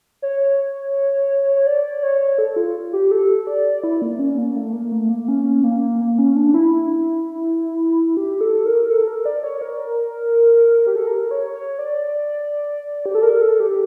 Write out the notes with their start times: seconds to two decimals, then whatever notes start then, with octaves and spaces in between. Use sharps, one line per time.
0.22 C#5
1.56 C#5
1.67 D5
2.03 C#5
2.38 A4
2.56 F4
2.93 G4
3.11 A4
3.47 D5
3.84 E4
4.02 A#3
4.19 C#4
4.38 A#3
4.56 A3
4.73 A#3
4.92 A3
5.09 A#3
5.28 C#4
5.64 A#3
6.00 A#3
6.19 C#4
6.36 D4
6.54 E4
8.17 G4
8.41 A4
8.66 A#4
8.90 A4
9.07 A#4
9.26 D5
9.43 C#5
9.61 A#4
10.87 G4
10.96 A4
11.07 A#4
11.31 C#5
11.54 C#5
11.79 D5
13.06 G4
13.15 A4
13.23 A#4
13.42 A4
13.60 G4